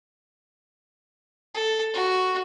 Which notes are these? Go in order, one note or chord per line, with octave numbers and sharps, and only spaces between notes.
A4
F#4